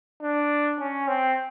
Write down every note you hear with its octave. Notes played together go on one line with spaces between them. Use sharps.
D4
C#4
C4